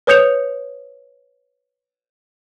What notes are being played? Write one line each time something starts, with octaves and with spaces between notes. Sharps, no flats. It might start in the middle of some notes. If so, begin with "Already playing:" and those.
B4 C#5 D#6 G6 C#7 F7